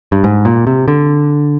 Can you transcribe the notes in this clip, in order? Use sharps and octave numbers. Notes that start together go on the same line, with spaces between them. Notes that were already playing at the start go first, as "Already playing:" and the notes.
G2
G#2
A#2
C3
D3